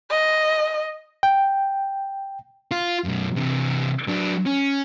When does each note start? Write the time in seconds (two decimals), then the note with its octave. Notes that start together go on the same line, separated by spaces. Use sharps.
0.10 D#5
1.23 G5
2.71 F4
3.05 F#2 B2
3.36 C3 E3
4.07 F#3 D4
4.46 C#4